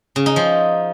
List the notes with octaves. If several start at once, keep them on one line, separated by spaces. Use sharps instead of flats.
C#3
D#4
F3